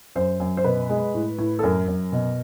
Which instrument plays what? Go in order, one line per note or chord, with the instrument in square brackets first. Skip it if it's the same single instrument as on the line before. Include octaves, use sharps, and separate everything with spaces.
[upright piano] F#2 C5
F#2
C5
B2 B4
G#3
A2
A2
A4
F#2 A#4
F#2
B2